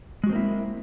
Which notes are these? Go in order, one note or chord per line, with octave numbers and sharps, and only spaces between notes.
G#3 A#3 C4 E4 F#4